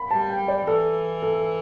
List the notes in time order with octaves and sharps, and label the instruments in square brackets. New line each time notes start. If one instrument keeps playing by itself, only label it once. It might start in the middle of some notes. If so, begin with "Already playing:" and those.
Already playing: [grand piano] B5
[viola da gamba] G3 [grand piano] A5
[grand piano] G5
D5
[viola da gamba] E3 [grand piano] A4
[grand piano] A4